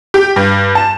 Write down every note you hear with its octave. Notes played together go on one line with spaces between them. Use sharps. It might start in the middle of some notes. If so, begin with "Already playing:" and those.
G4
G2
A5